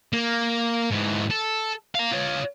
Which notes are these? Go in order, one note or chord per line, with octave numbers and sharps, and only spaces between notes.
A#3
G#2 E3
A4
F5 A#5
F4 C#5